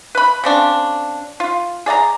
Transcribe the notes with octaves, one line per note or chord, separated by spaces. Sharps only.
B4 B5
C#3 C4 D4
F4
G#4 D5 F#5 A#5